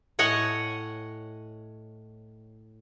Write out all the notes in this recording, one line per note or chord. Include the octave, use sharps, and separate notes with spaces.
A2 C#5 D#5 F#5 G#5